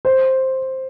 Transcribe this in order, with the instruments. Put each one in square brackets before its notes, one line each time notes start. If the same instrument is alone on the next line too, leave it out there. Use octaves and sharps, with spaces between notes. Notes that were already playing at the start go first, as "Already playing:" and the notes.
[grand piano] C5